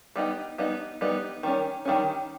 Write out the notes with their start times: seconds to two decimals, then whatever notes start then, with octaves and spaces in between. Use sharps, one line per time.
0.16 G3 B3 D#4
0.58 G3 B3 D#4
1.01 G3 B3 D#4
1.43 D#3 G3 C#4
1.85 D#3 G3 C#4